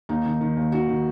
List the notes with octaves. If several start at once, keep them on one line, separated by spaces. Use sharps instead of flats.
D#2 D#4
D#3
D#3
D#2
D#3 F#4
D#3